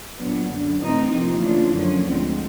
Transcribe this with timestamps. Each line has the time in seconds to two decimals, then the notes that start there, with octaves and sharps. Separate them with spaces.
0.18 A#2 F#3 B3 D4
0.49 F#2 D3 F#3
0.80 A2 E3 A3 C4 D#4
1.11 C3 F3 A#3 D#4
1.43 C#3 E3 A3 D4 F4
1.74 F#2 D3 F3 A#3 C#4
2.06 D2 D3 F3 G#3 C4